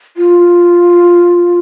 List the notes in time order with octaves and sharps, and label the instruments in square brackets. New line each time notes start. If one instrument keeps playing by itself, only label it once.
[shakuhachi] F4